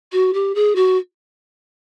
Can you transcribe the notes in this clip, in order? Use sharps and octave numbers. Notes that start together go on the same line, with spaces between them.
F#4
G4
G#4
F#4